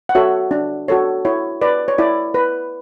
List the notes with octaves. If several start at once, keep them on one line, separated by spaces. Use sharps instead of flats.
F#5
F#4 A4 C#5 E5
D4
F#4 A4 C#5
E4 C#5
B4 D5
C#5
E4 D5
B4